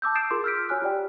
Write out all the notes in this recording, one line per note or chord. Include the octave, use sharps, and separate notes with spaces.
A5 D6 E6 G6
D#6 G6 A6 C7 D7 E7
F4 G#4 A#4 C6 D6
E6 F6 G6 B6 D7
F#4 C#5 G#5 F6 F#6
F4 G4 D5 G5